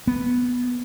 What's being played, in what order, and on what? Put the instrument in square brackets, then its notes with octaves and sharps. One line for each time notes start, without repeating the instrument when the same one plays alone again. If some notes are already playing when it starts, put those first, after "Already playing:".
[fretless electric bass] B3